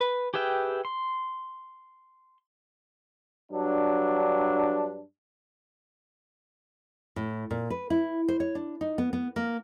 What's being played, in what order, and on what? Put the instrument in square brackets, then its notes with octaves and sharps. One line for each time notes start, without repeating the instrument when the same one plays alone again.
[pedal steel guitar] B4
G4 G#4 B4 E5 G5
C6
[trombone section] G2 F#3 D4
[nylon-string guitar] A2
A#2
B4
E4
C5
C#5
D4
D#4
B3
B3
A#3